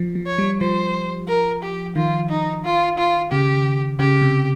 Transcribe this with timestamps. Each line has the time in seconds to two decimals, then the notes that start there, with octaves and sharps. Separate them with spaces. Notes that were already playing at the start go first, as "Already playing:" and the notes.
Already playing: F3
0.15 F3
0.27 C#5
0.38 G3
0.61 F3 C5
1.28 A#4
1.63 G4
1.96 D#3 F4
2.29 D#4
2.64 F4
2.98 F4
3.32 C#3 G4
3.99 C#3 G4
4.22 C3